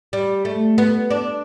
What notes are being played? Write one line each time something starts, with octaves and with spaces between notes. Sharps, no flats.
G3
A3
B3
D4